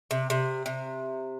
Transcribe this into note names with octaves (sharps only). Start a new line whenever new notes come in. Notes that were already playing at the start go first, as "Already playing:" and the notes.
C3
C3
C3